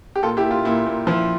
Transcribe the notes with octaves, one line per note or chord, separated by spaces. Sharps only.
G4
A#2 F4 A4
E4 G4
A#2
F4
A#2 E4
A#2
F3 E4